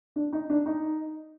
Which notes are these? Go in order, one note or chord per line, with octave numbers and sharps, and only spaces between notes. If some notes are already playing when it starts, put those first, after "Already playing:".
D4
D#4
D4
D#4